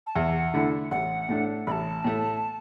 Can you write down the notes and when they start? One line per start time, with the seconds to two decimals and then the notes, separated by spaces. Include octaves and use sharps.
0.07 A5
0.16 E2 F#5
0.54 D3 A3 E4
0.91 A1 F#5
1.29 A2 A3 D4
1.67 A1 A5 B5
2.04 A2 A3